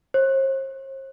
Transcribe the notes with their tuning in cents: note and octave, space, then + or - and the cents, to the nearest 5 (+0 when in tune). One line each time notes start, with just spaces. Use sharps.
C5 +45